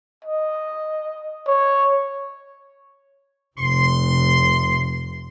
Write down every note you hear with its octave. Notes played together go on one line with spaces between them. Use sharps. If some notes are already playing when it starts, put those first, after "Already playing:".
D#5
C#5
F1 C6